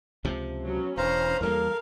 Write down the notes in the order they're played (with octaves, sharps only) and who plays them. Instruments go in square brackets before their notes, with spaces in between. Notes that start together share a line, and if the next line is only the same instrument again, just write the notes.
[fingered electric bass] C#2 C3 F3
[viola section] F#3 B3 C#4
[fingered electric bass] E1 [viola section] C#4 D4 B4 [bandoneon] C5 F5 A#5
[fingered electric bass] E2 G3 A#3 [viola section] A4 F5 [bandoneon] A#4